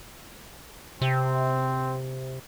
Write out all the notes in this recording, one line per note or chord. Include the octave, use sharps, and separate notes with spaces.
C3 C4